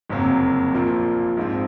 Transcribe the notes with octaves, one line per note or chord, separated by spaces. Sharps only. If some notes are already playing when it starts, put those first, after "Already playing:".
F#1 F2 C3 F#3 A#3
A#1 A#2 F3 A#3 F4
A#1 G#2 F3 C4